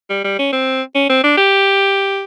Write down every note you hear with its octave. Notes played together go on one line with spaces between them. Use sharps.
G3
G3
C#4
C4
C#4
C4
D4
G4